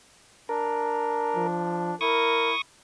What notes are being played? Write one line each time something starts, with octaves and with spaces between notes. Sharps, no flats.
D4 A#4
F3
E4 A#4 C#6 D#6